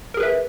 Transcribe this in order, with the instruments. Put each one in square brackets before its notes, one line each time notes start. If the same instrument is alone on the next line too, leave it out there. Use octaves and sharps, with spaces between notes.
[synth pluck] A#4
G#4
B4
E5